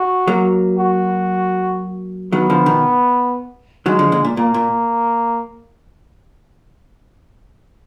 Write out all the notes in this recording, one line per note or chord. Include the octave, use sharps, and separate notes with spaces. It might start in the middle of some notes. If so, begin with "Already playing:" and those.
Already playing: F#4
F#3 A#3
F#4
D#3 F#3 B3
D3 F3
B2 D#3
D#3 F#3 G#3
D3 F3
A#2 D3
A#2
A#2 A#3
A#2